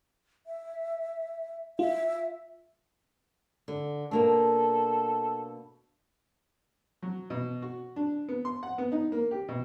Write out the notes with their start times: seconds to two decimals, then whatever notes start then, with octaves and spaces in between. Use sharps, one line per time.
0.47 E5
1.79 F4 E5
3.68 D3
4.11 B2 A#3 D4 A4
7.02 F#3
7.30 B2
7.62 F#4
7.96 D4
8.28 B3
8.45 C6
8.63 F#5
8.78 B3
8.92 D#4
9.12 A#3
9.31 G4
9.49 B2